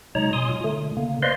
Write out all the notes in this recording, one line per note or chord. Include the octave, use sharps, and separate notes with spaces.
C3 F#3 G#3 D#4 C#5 A#5
B2 G#5 C6 D#6
F4
D3 A3
C#3 A#3
B4 C5 D5 D#5 F5 C6